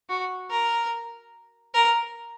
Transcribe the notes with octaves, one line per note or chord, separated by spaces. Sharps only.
F#4
A#4
A#4